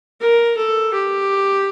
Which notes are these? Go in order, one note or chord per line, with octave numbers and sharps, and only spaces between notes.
A#4
A4
G4